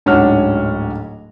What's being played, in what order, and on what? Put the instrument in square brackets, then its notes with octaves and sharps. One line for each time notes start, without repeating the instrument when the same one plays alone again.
[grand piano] D1 G#2 C#4 D4 F#4 F6